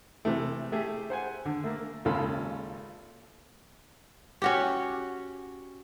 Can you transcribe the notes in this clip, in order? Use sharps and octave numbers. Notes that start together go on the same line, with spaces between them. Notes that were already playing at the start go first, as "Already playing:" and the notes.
C3 E3 A3
A3 G4 G#4
C5 F#5 G#5
D3
A3 A#3
G#1 D#2 C#3 F4 A4 B5
C#4 F#4 G4